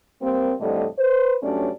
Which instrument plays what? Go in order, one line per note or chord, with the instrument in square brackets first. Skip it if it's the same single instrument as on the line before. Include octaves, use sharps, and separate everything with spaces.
[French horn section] G3 A#3 C4
F2 A2 D3 G3 A3 D#5
B4 C5
G2 F#3 A3 C#4 D4 D5